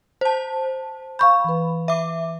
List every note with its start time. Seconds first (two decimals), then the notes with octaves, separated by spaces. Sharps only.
0.21 C5 A5
1.19 F5 B5 C#6 G6
1.44 E3 B4
1.88 E5 D6